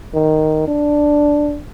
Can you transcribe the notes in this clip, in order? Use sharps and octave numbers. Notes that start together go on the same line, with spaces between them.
D#3
D4